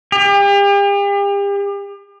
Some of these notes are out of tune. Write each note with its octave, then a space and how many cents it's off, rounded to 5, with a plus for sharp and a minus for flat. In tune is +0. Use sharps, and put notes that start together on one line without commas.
G4 +40